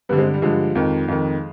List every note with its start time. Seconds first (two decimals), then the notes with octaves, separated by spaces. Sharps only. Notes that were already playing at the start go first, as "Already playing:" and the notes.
0.09 G2 D3 G3 B3
0.18 G#3 C4
0.34 G3
0.42 G2 D3 F3 G#3
0.75 F2 D#3
1.08 F2 D#3